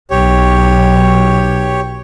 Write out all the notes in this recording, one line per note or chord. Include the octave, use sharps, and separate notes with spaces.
B1 G4 C#5